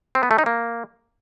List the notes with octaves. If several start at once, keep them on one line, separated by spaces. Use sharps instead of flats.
C4
B3
A3
D#4
A#3